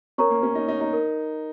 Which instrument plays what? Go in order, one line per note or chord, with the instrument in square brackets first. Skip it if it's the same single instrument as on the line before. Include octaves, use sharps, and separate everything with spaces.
[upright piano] C#4 [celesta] A#4 C#5 A#5 C#6
[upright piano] A#3
C#4
D#4
D#4
D#4
[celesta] A#4